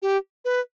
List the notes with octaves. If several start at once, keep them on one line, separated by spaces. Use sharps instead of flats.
G4
B4